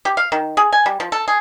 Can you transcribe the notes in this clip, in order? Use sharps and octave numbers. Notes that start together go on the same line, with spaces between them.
G4
F5
D#3
G#4
G#5
G3
F3
A4
G#4